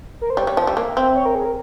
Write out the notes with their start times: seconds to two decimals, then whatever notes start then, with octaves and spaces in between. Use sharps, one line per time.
0.21 A#4
0.30 C5
0.37 G3 C#5
0.47 G3
0.57 F3 E5
0.67 G3
0.77 A#3
0.97 C4
1.16 C#5
1.25 A#4
1.35 G#4
1.45 A#4